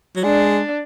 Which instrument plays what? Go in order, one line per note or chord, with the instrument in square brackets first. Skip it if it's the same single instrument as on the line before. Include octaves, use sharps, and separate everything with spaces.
[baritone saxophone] F#3
[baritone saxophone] G#3 [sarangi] D4